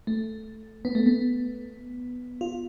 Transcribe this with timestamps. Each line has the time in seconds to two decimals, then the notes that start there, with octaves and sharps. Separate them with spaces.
0.07 A3
0.85 B3
0.95 A3
1.06 B3
2.41 F4